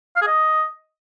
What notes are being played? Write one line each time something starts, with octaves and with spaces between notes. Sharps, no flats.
F5
G#4
D#5